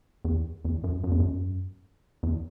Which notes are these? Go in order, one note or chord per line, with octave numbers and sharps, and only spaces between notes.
E2
E2
F#2
F#2
E2
F#2
E2